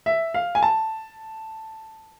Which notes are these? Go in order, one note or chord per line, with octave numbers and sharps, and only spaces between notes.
E5
F5
G#5
A5